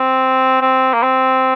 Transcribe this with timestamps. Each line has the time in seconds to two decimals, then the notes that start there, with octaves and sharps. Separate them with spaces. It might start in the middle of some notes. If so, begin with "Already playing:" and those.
Already playing: C4
0.61 C4
0.93 A#3
1.03 C4